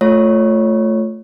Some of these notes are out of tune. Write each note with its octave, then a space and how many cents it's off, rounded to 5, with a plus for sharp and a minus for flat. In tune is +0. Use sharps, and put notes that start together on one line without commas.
A3 +0 F4 +5 C#5 -5